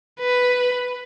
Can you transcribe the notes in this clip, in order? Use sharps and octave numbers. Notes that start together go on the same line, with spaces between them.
B4